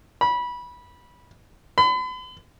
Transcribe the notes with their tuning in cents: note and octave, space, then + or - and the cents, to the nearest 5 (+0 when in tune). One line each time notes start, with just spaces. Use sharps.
B5 -20
B5 +40